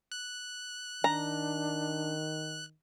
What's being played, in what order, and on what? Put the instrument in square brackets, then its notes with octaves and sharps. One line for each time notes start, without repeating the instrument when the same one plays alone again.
[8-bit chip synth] F#6
[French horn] D#3 [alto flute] D4 [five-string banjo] A#5